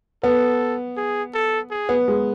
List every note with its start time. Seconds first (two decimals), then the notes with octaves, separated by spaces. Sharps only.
0.23 B3 A4
0.97 G#4
1.34 A4
1.71 G#4
1.89 B3
2.08 G#3